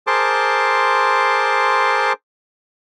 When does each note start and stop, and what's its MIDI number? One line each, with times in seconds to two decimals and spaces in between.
0.07 2.13 68
0.07 2.13 70
0.07 2.13 72
0.07 2.13 81
0.07 2.13 84
0.07 2.13 86